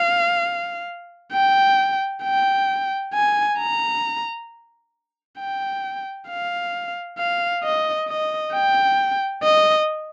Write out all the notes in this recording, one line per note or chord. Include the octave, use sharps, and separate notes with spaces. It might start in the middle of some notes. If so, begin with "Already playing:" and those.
Already playing: F5
G5
G5
G#5
A#5
G5
F5
F5
D#5
D#5
G5
D#5